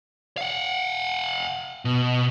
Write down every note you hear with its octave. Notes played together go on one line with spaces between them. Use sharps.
F5 F#5
B2